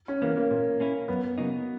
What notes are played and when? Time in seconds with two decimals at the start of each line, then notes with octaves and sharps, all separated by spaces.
0.08 C#4
0.22 E3 A#3 B3
0.37 A#3
0.51 A#2
0.80 A#3 C#4 E4
1.08 F#2 B3
1.38 C#3 F#3 A#3 D#4